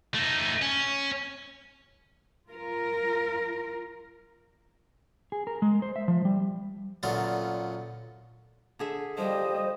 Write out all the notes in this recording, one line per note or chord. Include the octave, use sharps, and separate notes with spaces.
A3 D#4
C#4
F4 A#4
G#4
A#4
G#3
C5
E5
F3
G3
F#2 A#2 D3 B3 F4
D3 G#4 E5
F3 G3 C5 D#5